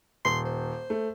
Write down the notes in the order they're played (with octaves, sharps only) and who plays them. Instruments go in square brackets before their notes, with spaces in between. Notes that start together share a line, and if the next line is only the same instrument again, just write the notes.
[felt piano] D#1 [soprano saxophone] C6
[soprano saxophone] C5
[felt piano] A3